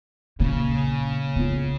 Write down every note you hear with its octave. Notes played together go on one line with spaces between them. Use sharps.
A#2 C#3 A#3
B3 F4